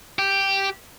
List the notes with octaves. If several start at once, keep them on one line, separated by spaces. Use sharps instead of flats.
G4